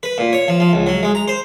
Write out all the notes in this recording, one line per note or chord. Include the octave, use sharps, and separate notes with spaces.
B4
A#2
C#5
F3
F3
C#2
F#3
G#3
A#5
C5